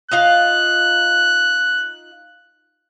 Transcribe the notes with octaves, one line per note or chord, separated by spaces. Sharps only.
D#4 F4 F5 F#6